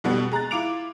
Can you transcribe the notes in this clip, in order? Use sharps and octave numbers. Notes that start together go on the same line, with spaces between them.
F2 B2 D3 G3 B3
G#3 A#5 F#6 A6
E4 F4 D6 D7 F7